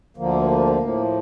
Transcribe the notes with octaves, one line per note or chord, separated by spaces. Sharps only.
D2 D3 F3 A#3
A2 F3